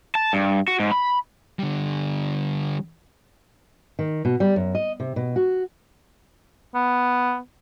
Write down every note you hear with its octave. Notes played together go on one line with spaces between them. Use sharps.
A5
G2
F#4
G#2
B5
D3 G3
D#3
B2
G3
F#2
D#5
C3
B2
F#4
B3